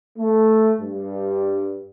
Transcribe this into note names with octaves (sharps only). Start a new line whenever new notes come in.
A3
G2